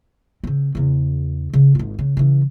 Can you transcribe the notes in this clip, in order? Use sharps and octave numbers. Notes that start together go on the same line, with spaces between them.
C#3 C4
E2 C#3
C#3
G#1 F4
C#3
C#3 E3